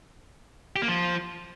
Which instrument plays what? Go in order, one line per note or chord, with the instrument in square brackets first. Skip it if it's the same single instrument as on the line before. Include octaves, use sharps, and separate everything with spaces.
[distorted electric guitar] G4
A#3
F3